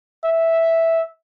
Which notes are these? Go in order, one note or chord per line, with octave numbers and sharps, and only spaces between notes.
E5